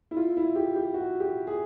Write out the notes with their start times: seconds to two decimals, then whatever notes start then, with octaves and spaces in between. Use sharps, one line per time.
0.11 E4
0.16 F4
0.37 E4
0.55 G4
0.75 G4
0.94 F#4
1.20 G4
1.47 G#4